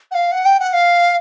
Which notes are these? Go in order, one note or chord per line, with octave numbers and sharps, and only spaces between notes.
F#5
F5
F#5
G5
F#5
F5